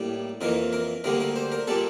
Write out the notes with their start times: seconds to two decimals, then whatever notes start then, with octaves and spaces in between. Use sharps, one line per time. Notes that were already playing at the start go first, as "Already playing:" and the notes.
Already playing: A2 G3 A#3
0.41 F2 E3 A#3 A#4
0.73 A#4
1.04 D2 D3 G3 A#3 A#4
1.20 A#4
1.36 C5
1.52 A#4
1.67 A#2 G3 A#3 A4